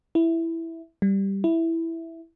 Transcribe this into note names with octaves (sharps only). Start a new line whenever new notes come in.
E4
G3
E4